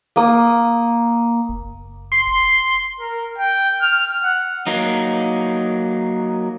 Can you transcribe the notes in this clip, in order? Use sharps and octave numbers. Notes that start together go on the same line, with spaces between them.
A#3 D#6
F#1
C6
A#4
G5
F6
F#5
F#3 A#3 D#4